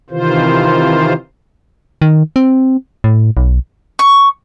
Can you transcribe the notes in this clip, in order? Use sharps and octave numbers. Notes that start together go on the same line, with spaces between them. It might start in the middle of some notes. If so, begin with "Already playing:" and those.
C3 D#3 E3 F4 C5
D#3
C4
A2
B1
C#6